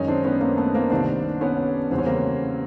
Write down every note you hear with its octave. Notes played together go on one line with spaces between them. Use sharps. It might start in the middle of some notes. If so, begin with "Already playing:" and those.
Already playing: F#2 D#3 G#3 C#4 D#4
C4 D4
B3 C#4
A#3 C4
A3 B3
A#3 C4
C2 C3 D#3 C4 D4
B3 C#4
E2 C#3 E3 G3 C4
C#4
A#3 C4